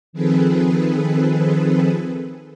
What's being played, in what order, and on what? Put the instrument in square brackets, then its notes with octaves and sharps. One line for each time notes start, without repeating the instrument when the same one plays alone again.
[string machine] D#3 F3 C4 G#4 A4 B4